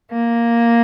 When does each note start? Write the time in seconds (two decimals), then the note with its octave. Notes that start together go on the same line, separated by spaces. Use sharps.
0.11 A#3